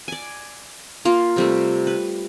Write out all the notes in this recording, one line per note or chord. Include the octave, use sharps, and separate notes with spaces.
D5 G#5
A#3 F4
C3 G3 A3
B4